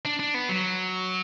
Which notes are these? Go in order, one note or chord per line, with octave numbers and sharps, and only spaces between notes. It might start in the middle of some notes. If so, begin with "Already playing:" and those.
D4
D4
B3
F#3